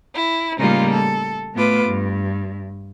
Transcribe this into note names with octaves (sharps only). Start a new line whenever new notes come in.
E4
A2 C#3 G3 A#3 D#4 F4
A4
A2 A3 B3 F4 B4 D6
G2